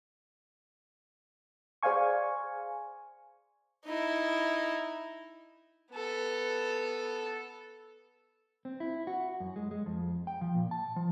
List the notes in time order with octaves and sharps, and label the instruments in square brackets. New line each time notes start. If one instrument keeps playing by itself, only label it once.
[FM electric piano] G#4 C5 D5 F5 G#5 C#6
[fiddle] D#4 E4
B3 A4
[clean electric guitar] C4
E4
F#4
F#2
G#3
G#3
F2
G5
F3
A#2
A5
F3